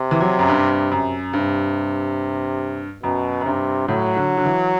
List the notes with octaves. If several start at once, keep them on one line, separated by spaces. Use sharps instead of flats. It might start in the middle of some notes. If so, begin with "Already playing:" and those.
Already playing: C3
E3
F#3
F#2
G2
F#2
G2 C3
F#2 B2
F#2
G2 C3
A2 F#3
D3
D3
E3